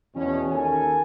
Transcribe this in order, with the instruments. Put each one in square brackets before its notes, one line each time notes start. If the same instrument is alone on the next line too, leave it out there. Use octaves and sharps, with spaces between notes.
[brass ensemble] E2 B2 C#4
D#2 A4 A#4 G#5